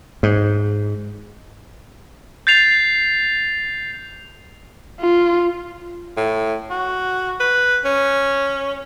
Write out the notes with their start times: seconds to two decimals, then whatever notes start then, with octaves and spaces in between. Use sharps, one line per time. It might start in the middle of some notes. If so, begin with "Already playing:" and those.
0.23 G#2
2.47 G6 A6 C7 F7
5.01 F4
6.17 A2
6.70 F#4
7.40 B4
7.85 C#4